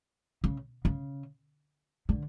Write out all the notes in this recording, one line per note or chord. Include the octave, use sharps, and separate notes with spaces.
C#3
C#3
D3